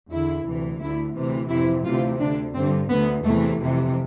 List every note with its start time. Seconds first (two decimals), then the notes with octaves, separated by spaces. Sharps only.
0.11 E2 D3 E4
0.46 D2 C3 E3
0.80 D2 D3 E4
1.15 D2 C3 E3
1.50 F2 C3 E3 E4
1.85 D2 C3 E3 F4
2.20 D2 D3 D4
2.54 G2 D3 C4
2.89 D2 D3 B3
3.24 E2 C3 E3 A3
3.59 F2 C3 E3